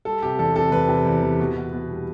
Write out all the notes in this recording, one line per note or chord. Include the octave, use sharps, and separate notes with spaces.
G3 A4
C3 G4
E2 A4
C3 A4
E2 B4
C3
E2
E2
B2
B2
B2
G3